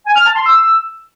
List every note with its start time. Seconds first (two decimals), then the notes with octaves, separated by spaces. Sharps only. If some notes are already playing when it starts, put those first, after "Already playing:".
0.06 G#5
0.16 F6
0.25 A5
0.35 C6
0.45 E6